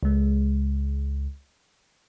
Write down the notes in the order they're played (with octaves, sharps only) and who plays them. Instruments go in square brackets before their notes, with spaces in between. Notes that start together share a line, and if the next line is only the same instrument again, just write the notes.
[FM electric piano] C#2 G#3